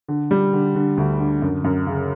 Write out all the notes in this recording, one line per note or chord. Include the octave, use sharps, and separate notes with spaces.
D3
G3
D3
D3
D2
D3
F#2
F#2
C#3